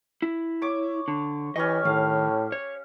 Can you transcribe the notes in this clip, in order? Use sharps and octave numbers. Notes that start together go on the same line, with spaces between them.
E4
C#5 D6
D3
E3 C#4 G4 D#5 C#6
A2 D#3 F5
C#5